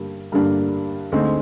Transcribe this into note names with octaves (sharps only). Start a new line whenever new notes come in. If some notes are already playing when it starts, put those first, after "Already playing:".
Already playing: G2 D3 G3 A#3
G2 D3 G3 A#3 D4
D2 D3 G#3 C4 D#4